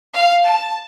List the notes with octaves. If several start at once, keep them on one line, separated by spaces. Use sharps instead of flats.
F5
A5